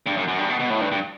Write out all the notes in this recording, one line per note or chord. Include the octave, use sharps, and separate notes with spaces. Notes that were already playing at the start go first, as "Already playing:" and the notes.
G2
F#2
F#2
G2
B2
B2
A2
G2
G2